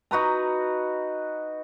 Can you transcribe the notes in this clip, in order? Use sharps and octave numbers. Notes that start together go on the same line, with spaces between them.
D#4 F#4 B4 A#5